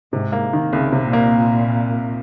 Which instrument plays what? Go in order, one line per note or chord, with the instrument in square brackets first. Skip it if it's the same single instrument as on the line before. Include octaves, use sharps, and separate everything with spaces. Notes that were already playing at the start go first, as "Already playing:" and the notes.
[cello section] G#2 [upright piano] C3
[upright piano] A#3
D#3
[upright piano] C2 [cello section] C#3
[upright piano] C3
[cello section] A#2
[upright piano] A#3